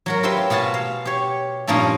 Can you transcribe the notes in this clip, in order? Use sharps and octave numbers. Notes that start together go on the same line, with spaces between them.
F#3 F#4 A#4
F4 G4 B4 C5 E5 G5
B2 F4 F#4 G#5 A5
F5
G4 C#5
G2 A#2 F3 A#3 C#4 D#4